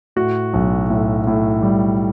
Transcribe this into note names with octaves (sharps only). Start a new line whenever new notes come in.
A2 F#4
B1
A2
A2
G3